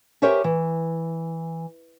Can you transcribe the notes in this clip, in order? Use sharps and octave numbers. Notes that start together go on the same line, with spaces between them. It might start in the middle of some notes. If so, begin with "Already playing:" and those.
G4 A#4 C5 C#5 E5 G#5
E3